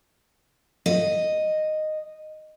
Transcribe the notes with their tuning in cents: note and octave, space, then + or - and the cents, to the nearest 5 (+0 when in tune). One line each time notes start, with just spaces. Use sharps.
D#5 -5